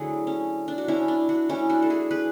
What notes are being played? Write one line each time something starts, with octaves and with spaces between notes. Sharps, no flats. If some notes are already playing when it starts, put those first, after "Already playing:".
Already playing: D3 F#3 A3 E4 G#4
C#4
D4
F#4
C#4 E4
D4
D4 F#4
E3 A3 C#4 E4
D4 F#4
A4
E4 G#4
G#4 B4